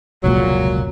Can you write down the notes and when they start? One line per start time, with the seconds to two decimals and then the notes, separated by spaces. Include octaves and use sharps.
0.24 F1 C#2 A#2 F#3